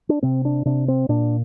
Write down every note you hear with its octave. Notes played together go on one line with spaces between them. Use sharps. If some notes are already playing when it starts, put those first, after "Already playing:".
D4
C3 C4
D4
C3 D4
C4
A#2 D4